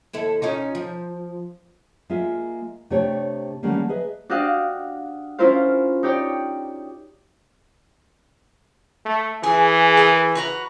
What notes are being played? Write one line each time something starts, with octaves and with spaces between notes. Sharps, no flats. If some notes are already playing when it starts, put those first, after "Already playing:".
D#2 E4 A4
C#4 D#4 F4
F3
G#3 A#3 F4 E5
C3 A3 D4 G4 C#5
D3 D#3 G3 A3 A#3 C#4
G#4 B4 D#5 E5
D4 F#4 G4 D#5 F5
C#4 E4 F4 A#4 C5 F5
D#4 G4 C#5 D5 G5
A3
E3 G#4
G#4 A#4
F#4 B4 A#5